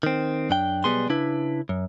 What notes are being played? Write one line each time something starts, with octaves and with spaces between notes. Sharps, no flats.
D#3 C4
F#2 D4 G5
B1 F#2 G3 B3 G#4 C6
C#3 D4 E4 B4
F#2